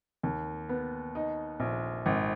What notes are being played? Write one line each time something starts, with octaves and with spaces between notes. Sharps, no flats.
D#2
B3
D#4
A#1
G#1